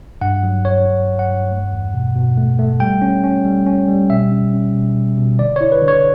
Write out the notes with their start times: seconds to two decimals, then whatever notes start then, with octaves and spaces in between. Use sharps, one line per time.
0.21 G2 F#5
0.43 F#3
0.65 G2 C#5
0.86 G2
1.08 G2
1.19 F#5
1.30 G2
1.51 A3
1.73 E2
1.94 B2
2.16 B2
2.37 A3
2.59 A3
2.80 G3 G5
3.02 C#4
3.24 C#4
3.45 G3
3.66 C#4
3.88 G3
4.10 B2 E5
4.31 C#4
4.53 C#4
4.75 B2
4.96 B2
5.18 B2
5.39 D3 D5
5.56 E4 C#5
5.72 B4
5.82 D3
5.88 C#5